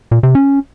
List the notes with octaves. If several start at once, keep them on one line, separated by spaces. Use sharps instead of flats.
A#2
C3
C#4